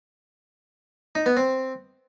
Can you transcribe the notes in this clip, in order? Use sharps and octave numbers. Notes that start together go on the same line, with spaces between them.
D#4
B3
C4